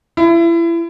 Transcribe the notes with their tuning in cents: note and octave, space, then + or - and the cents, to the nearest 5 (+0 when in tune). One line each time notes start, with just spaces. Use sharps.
E4 +30